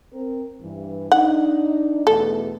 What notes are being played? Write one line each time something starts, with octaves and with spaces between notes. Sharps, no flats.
C4 A#4
G2 E3
D4 D#4 F#5
E2 B2 A3 A4